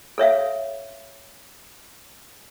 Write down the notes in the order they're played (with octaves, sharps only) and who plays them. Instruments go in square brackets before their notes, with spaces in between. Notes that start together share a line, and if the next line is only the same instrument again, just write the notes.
[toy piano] A4 C#5 E5 F5